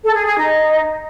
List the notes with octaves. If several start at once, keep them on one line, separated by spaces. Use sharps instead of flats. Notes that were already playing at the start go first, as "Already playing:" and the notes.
A4
G#4
G#4
D#4